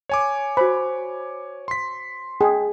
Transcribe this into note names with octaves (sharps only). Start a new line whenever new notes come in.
C#5 G#5 D6
F#4 C5 B5
C6 B6
G#4 G5